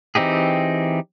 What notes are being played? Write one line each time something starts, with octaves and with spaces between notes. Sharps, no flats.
E3 C4 D#4 G4 G#4